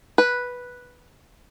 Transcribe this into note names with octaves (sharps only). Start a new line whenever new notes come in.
B4